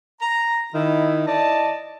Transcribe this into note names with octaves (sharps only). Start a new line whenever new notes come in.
A#5
D#3 E4
E4 D5 D#5 A5